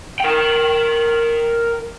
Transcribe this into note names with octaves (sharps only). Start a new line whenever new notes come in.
A#4 G5